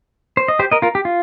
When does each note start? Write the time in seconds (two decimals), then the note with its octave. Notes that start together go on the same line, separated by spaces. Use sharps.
0.37 C5
0.48 D#5
0.59 G4 C5
0.72 A#4 D#5
0.82 F4 A#4
0.95 G4
1.05 F4